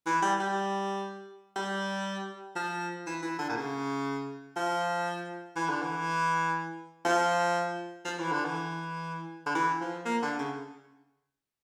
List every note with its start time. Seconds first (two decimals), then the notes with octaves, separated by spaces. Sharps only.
0.06 E3
0.22 G3
0.40 G3
1.56 G3
2.56 F3
3.07 E3
3.22 E3
3.39 D3
3.49 A#2
3.57 C#3
4.56 F3
5.56 E3
5.69 D3
5.82 E3
7.05 F3
8.05 F3
8.19 E3
8.32 D3
8.46 E3
9.46 D3
9.55 E3
9.81 F3
10.05 A#3
10.22 D3
10.39 C#3